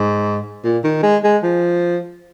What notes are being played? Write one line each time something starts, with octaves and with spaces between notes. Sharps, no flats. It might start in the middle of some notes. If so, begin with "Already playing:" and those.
Already playing: G#2
A#2
D#3
G#3
G#3
F3